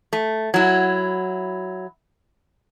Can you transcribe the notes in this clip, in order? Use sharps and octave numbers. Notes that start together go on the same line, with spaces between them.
A3
F#3 E4